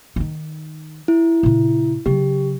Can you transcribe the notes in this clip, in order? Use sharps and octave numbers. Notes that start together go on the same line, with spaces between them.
D#3 D#4
E4
A#2 C#3
C#3 F#3 G4